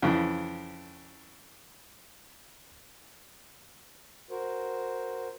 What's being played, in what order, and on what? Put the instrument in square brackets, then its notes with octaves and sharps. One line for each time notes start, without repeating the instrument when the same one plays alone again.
[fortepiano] F2 C#3 E3
[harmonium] F#4 A#4 C5